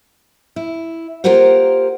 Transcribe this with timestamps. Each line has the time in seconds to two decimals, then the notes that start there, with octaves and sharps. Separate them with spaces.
0.56 E4
1.24 A#3 F4 G4 A#4 C5 F#5